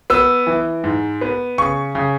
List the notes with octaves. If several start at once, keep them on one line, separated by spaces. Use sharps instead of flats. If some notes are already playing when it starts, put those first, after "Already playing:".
B3 E6
E3
G#2
B3
C#3 C#6
C#3